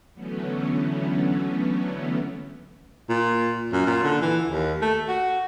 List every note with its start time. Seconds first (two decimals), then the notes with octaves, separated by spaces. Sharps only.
0.14 D3 E3 F#3 A3 B3 C#4
3.09 A#2
3.73 F#2
3.86 A#2
4.04 D3
4.21 E3
4.48 D#2
4.81 A3
5.08 F#4